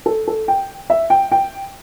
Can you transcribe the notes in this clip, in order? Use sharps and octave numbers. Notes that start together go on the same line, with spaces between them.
A4
A4
G5
E5
G5
G5